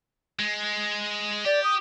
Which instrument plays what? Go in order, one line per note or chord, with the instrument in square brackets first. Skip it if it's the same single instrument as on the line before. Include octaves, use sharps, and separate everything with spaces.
[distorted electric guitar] G#3
[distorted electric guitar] G4 [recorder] D5
[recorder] D#6